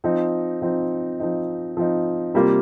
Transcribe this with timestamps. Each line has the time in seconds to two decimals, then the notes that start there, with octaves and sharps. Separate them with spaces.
0.04 F3 C4 D#4
0.62 F3 C4 D#4
1.20 F3 C4 D#4
1.77 F3 C4 D#4
2.34 C3 G3 A#3 F4